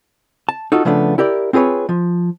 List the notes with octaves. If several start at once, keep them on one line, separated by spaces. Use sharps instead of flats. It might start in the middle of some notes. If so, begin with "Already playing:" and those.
A5
D#4 F4 F#4 A4
C#3 F3 A3 B3 D4
E4 G4 A#4 D5
C4 F4 G#4 B4 C#5
F3